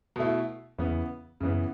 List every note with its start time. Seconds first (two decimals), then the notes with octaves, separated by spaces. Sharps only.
0.16 B2 A3 E4
0.78 E2 C#3 E3 B3
1.40 F#2 C#3 E3 B3